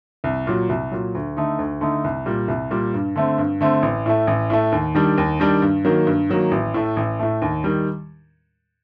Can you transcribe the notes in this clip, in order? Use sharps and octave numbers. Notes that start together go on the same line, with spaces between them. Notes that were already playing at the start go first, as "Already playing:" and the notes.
C2
A#2 F#3
C2
A#2 F#3
D2
D3 A3 D#4
D2
D3 A3 D#4
C2
A#2 G3
C2
A#2 G3
G2
D3 A3 C4
G2
D3 A3 C4
A1
A2 A3
A1
A2 A3
D#2
D#3 G3 D4
D#2
D#3 G3 D4
G2
D#3 F#3 A#3
G2
D#3 F#3 A#3
A1
A2 A3
A1
A2 A3
D#2
D#3 G3